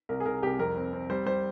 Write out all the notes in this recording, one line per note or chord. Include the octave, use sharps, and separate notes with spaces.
C2 A#4
G#4
C2 A#4
C2 G4
F2 A#4
C4
C4
G3 C5
G3 C5